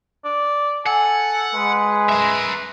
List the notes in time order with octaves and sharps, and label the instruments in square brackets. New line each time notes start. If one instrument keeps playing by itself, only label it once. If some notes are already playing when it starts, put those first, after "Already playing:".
[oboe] D5
[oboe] A4 [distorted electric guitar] F#5 [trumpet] G#5
[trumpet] G#3 [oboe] B4
[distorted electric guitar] A#4 E5